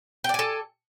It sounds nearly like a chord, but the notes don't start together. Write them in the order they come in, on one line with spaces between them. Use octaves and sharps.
G5 D5 G#5 A4